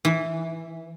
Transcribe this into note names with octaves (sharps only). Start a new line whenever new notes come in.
E3